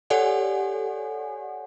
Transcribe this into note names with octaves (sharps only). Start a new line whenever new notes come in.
G4 A4 C#5 D5 F#5 G#5